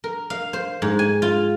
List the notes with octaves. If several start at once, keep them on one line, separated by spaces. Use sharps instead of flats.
A#4
F5
C5
G#2
G#5
F4